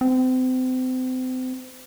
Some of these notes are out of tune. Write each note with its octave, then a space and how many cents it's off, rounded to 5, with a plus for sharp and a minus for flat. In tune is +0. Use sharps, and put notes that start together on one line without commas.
C4 -35